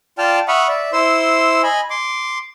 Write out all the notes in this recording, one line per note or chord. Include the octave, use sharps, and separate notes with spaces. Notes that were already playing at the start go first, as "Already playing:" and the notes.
F4 D5 G5 A5 F6
E5 F#5 B5 C#6 D#6 F6
D5 E5
E4 C5 C6 E6
D#5 G#5 B5
C6 D6